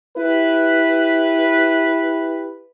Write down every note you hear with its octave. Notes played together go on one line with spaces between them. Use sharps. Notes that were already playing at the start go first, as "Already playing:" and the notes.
E4 G4 B4